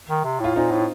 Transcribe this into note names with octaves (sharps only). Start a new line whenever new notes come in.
D#3
C3
A2 F4
A#2 C4 D#4
A2